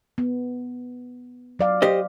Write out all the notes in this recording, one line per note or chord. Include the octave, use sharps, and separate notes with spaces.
B3
F#3 D5 F5
G4 C5 D#5